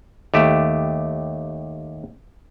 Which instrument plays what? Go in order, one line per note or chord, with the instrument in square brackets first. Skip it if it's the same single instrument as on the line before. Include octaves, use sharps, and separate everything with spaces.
[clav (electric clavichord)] D#2 A3 G4